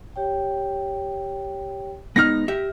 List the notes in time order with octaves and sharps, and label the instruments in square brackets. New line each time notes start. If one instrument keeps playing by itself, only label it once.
[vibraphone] G4 C#5 G5
[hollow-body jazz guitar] G#3 B3 D#4 [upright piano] F6 A#6
[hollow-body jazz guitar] G4 E5